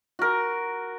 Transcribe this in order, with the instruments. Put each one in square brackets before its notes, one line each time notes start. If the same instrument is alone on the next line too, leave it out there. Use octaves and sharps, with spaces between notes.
[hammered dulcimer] F#4 A#4